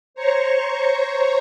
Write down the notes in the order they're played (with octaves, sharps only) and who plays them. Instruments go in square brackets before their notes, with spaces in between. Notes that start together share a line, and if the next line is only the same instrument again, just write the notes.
[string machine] C5 C#5 A#5 C#6